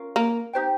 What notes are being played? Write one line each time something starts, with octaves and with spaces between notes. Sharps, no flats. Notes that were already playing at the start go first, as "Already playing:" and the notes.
Already playing: C#4 F4 A#4 F5
A#3
D#4 G4 C5 G5